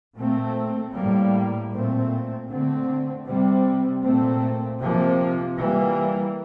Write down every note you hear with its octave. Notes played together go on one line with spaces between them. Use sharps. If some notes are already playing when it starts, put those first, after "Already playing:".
A#2 A3 C4
A2 G3 A#3
A#2 A3 C4
D3 A3 C4
C3 G3 C4
A#2 A3 C4
C3 F3 A#3
E3 G3 A#3